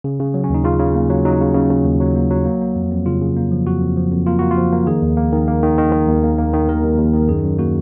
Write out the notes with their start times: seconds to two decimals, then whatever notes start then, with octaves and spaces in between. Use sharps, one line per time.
0.04 C#3
0.20 C#3
0.34 F#3
0.44 C#4
0.50 D#2 D#4
0.64 C#3 F4
0.79 C#3
0.95 A#3
1.10 F#3
1.25 F#3 D#4
1.41 C#3
1.55 C#3
1.70 C#3
1.85 D#2
2.00 F#3
2.16 A#3
2.30 F#3
2.45 A#3
2.61 A#3
2.76 F2
2.91 F2
3.06 C#3 F4
3.21 C#3
3.36 A#3
3.52 F3
3.67 F2 F#4
3.81 F2
3.97 F3
4.12 F2
4.27 A#3 F4
4.39 A#3 F#4
4.51 F4
4.57 F3
4.72 A#3
4.87 D#3 G#4
5.02 D#2
5.17 A#3
5.32 D#3
5.48 A#3
5.63 D#3
5.78 D#3
5.92 D#3
6.08 D#2
6.23 A#3
6.39 A#3
6.53 D#3
6.68 D#2 A#4
6.83 D#2
6.99 D#2
7.14 D#3
7.28 F#2 G#4
7.43 F#2
7.58 A#3 F#4